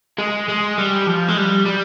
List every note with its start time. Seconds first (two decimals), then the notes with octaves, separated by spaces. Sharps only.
0.18 G#3
0.49 G#3
0.78 G3
1.07 F3
1.28 G#3
1.37 G3
1.65 G3